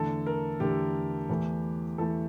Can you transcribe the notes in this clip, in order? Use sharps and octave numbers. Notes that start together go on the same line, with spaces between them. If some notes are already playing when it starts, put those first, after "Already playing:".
Already playing: E2 D3 A3 A4
A#4
E2 D3 A3 G4
E2 E3 A3
E2 E3 A3 A4